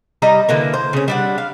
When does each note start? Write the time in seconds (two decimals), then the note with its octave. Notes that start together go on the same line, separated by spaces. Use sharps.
0.22 G3 D#5 A#5
0.49 D3 E3 A#3
0.74 C5
0.93 C#3 C#4
1.08 G3 D4 F#5
1.38 F5